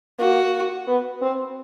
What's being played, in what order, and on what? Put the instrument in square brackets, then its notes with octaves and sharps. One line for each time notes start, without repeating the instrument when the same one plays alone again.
[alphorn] A#3 [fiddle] F#4
[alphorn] B3
C4